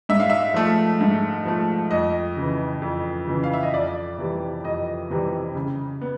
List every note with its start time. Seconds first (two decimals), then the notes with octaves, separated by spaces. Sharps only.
0.09 G#2 E5
0.20 F5
0.30 E5
0.54 F3 A3
1.01 G#2
1.45 F3 A3
1.91 F2 D#5
2.36 C#3
2.42 E3
2.82 F2
3.27 C#3 E3
3.43 F5
3.54 E5
3.63 D#5
3.73 F2 D5
4.18 C3 E3 G3
4.64 F2 D#5
5.10 C3 E3 G3
5.55 C#3
6.01 B3